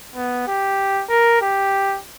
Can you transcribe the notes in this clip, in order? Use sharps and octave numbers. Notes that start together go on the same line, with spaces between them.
B3
G4
A#4
G4